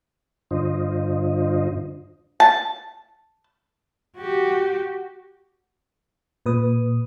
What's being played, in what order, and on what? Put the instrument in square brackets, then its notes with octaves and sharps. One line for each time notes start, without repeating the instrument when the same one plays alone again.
[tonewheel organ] G2 D3 D4 F4 C5 D#5
[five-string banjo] A5
[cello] F#4 G4
[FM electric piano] A#2 B4 D#6